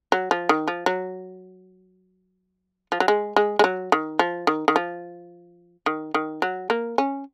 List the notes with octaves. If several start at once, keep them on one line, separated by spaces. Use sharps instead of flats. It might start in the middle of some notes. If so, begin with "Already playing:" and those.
F#3
F3
D#3
F3
F#3
F3
F#3
G#3
G#3
G#3
F#3
D#3
F3
D#3
D#3
F3
D#3
D#3
F#3
A#3
C#4